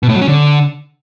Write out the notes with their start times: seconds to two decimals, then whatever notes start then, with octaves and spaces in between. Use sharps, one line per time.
0.03 B2
0.09 A2
0.15 F#3
0.21 C#4
0.28 D3